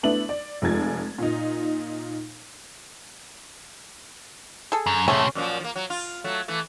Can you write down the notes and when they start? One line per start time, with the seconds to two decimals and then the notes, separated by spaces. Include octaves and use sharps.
0.03 A3 B3 D4 E4 F#7
0.29 D5
0.62 F1 F3 G#3 G#6 A6
1.18 A#2 D#4
4.72 G#4 A4
4.86 F#2
5.08 A2 C3 A3 C#4 G#4
5.35 F#2 A#2 F3
5.60 F3 A#3
5.76 F#3
5.90 F4
6.24 F#3 A3
6.48 E3 A3